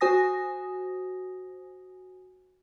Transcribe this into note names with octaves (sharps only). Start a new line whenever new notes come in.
F#4 C5 G#5 D#6 A#6